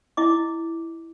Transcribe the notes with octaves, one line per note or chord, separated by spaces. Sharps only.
E4 D#5 D6